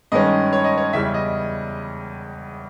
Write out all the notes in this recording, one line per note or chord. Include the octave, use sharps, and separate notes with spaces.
G2 D#3 G#3 C#4 D#5
C#5
D#5
C#5
E2 C#3 G3 E5
D#5